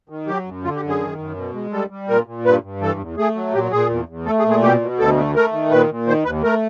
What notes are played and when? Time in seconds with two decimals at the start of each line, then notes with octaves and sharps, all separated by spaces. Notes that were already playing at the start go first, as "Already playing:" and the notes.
0.09 D#3
0.27 F#3 G4
0.45 F#2
0.64 D3 F4
0.76 G4
0.82 F#2
0.89 G#4
1.00 D#3
1.18 F#2
1.36 B2
1.54 G#3
1.73 G3 A4
1.90 G3
2.08 A#2 A#4
2.27 A#2
2.45 G2 B4
2.63 G2
2.81 E3 A4
2.99 E2
3.17 A3 G#4
3.35 F#3
3.54 A#2 G4
3.71 A#2 G#4
3.90 E2
4.08 E2
4.26 A3 A4
4.39 G#4
4.44 A#2
4.50 G#4
4.62 B2 G4
4.81 B2
4.99 D2 A4
5.17 A3
5.35 A3 A#4
5.52 D#3
5.71 A#2 B4
5.90 A#2
6.07 D#3 C5
6.25 D#2 B4
6.43 A3 A#4